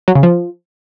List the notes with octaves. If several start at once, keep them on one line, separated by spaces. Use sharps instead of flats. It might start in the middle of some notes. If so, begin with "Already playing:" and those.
F#3
C#3
F3